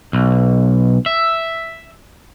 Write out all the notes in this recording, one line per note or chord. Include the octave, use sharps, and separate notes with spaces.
B1
E5